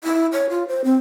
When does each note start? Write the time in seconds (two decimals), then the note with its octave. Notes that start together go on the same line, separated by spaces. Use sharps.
0.04 E4
0.33 C#5
0.50 F4
0.68 C5
0.84 C4